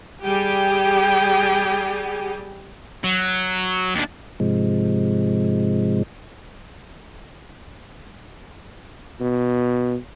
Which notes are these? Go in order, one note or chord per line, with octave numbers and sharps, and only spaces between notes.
G3 G4 G#4 G5
F#3
D#2 D4
G#2 C3 F3 G#3
B2